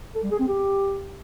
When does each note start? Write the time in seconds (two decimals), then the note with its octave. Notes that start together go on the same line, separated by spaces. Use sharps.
0.15 A4
0.23 G3
0.31 G#4
0.39 C4
0.48 G4